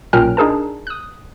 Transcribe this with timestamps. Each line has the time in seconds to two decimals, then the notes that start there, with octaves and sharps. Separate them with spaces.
0.13 B1 A#2 C#4 A#4 G5 F6
0.37 D4 D#4 G#4 A#4 A5
0.87 D#6 F#6